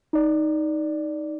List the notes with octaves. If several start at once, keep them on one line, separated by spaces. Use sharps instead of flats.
D#4 D5